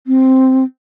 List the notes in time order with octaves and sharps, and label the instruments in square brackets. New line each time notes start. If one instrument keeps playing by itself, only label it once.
[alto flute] C4